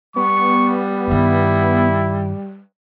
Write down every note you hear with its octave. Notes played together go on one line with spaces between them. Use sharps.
G3 B3 C#6
G2 D#3 E4